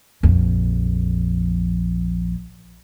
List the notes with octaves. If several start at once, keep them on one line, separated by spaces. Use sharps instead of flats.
A#1 F2